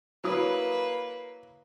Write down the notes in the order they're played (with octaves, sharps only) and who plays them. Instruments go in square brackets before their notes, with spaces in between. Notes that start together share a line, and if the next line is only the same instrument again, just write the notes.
[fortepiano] F#3 E4 D#6 [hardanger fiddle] A#3 B4